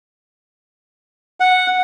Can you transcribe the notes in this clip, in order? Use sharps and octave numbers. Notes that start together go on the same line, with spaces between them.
F#5